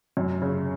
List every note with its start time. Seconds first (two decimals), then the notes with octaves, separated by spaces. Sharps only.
0.17 F#2
0.42 C#3